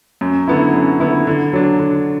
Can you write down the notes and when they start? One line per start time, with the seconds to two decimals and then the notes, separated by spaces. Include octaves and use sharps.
0.21 F#2
0.48 D3 B3 E4
0.74 F#2
1.00 D3 B3 E4
1.27 D3
1.53 F#3 D4
1.80 D3